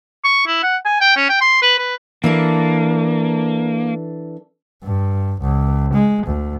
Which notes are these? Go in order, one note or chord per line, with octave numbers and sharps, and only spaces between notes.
C#6
E4
F#5
G#5
G5
C#4
G5
C6
B4
B4
E3 A#3 D4 A4
G2
C#2
G#3
D2